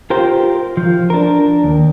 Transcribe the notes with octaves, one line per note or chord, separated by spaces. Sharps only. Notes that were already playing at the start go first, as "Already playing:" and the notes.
F4 G4 A#4 C5
F3
D4 A#4
D#2